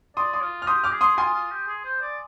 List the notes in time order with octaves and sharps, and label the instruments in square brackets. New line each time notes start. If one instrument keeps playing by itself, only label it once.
[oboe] D5 [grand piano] C6 D#6
[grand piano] C6 D#6
[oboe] F4
[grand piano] F6
[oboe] G4 [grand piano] C6 D#6
[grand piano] D6 F6
[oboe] G#4
[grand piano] C6 D#6
[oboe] F4 [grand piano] G#5 C6
[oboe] F4
G4
G#4
C5
D5